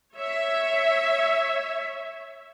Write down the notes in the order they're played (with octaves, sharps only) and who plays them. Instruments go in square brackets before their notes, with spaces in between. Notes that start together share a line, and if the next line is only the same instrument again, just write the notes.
[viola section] C#5 E5